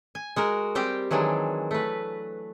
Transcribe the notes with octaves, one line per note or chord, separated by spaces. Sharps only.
G#5
G#3 F#4 A#4
G3 C4 G4 G5
D#3 E3 F#3 G#3 D4
A3 B4